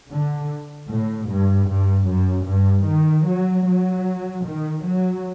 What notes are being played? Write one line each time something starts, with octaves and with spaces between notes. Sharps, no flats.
D3
A2
G2
G2
F#2
G2
D#3
F#3
F#3
D#3
F#3